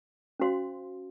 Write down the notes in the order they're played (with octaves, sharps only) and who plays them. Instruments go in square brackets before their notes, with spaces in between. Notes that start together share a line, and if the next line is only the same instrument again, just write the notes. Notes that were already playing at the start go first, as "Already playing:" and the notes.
[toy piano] C#4 F#4 C5 F5 C6